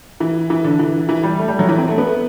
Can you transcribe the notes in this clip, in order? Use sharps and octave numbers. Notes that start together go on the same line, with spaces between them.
E3
E3
D3
E3
E3
G3
A3
G3
F#3
E3
C4
A3
B3